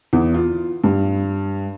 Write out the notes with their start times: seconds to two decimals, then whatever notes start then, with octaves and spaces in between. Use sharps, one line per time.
0.13 E2
0.35 F4
0.84 G2